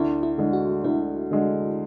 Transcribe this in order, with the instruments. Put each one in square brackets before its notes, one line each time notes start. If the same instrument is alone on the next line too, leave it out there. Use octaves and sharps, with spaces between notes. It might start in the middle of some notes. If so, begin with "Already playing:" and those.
Already playing: [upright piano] D2 [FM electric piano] E4
[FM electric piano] E4
[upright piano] D3 G#3
[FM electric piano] F#4
[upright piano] D2 [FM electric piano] E4
[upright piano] D3 G#3